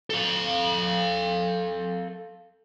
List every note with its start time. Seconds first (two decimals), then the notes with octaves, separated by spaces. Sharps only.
0.10 A4 F5